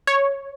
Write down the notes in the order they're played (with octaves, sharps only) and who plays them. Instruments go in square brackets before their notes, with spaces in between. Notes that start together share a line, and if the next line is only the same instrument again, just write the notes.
[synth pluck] C#5